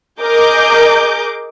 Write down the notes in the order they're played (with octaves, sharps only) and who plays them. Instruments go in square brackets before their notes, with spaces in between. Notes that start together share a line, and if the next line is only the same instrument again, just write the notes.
[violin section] G#4 A#4 D#5 D6 G6